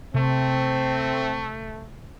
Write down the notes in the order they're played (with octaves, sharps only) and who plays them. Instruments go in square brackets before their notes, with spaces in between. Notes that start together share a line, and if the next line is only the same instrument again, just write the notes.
[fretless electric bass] C3 [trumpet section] A3 [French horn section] C4